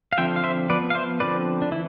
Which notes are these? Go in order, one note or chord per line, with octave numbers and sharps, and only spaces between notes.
F5
D3 F3 C4 E5 G5
F5
C5 E5
F3 B3 B4 D5
F5
C5 E5
D3 F3 C4 B4 D5
D4
E3 E4